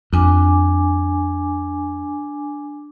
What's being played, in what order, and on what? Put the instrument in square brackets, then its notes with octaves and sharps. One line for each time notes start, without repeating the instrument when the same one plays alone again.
[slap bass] F2 [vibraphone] D4 G#5 D6